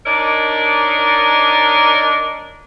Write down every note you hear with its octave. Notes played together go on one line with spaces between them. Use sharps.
D4 D#4 A#4 C#5 D5